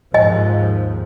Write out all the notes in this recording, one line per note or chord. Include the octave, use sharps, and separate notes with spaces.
D#2 G#2 F3 D#5 G#5